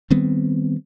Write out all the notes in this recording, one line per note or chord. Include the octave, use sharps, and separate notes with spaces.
D#3 G3 B3 C4